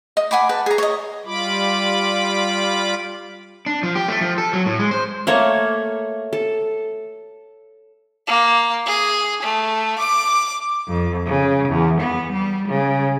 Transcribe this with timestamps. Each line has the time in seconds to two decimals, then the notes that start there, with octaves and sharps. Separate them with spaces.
0.17 D#5
0.31 F#5 G#5 B5 D6
0.49 B4 A5
0.66 G#4 A#5
0.78 C#5 D#5
1.25 G3 F4 B5 D6
3.66 D4
3.83 F3
3.95 G4
4.08 A3
4.21 F3
4.38 A4
4.53 F#3
4.66 A2
4.79 G#3
4.91 C5
5.27 A3 A#3 A4 C#5
6.33 A4
8.27 A#3
8.86 G#4
9.42 A3
9.99 D6
10.88 F2
11.26 C#3
11.69 E2
12.00 B3
12.32 G3
12.68 C#3